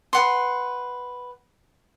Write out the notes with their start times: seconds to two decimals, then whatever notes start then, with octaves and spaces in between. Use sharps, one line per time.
0.13 B4 F#5 C6